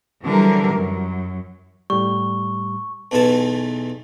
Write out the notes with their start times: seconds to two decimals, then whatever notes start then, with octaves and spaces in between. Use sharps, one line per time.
0.24 D3 E3 F#3 G3 A#4
0.75 F#2
1.90 A2 G3 C#6
3.11 B1 E2 B2 E3 G#5 A5